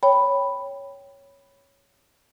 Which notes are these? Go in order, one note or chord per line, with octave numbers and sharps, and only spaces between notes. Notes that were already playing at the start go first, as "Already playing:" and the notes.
C#5 G5 B5